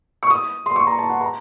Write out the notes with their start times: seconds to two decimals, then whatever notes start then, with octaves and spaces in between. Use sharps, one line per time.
0.23 C#6
0.30 D#6
0.66 C6
0.76 C#6
0.87 A#5
0.99 A5
1.10 F#5
1.21 A#5